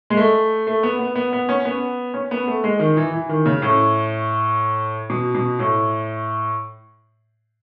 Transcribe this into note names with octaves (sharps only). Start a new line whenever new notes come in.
G#3
A3
A3
B3
B3
B3
B3
C#4
B3
C#4
B3
A3
G#3
D#3
E3
E3
D#3
C#3
A2
B2
B2
A2